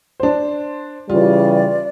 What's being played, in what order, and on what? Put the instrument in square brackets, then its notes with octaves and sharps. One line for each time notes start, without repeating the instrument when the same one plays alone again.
[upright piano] D4 C5
[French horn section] C#3 E3 G3 [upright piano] F4 [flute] D5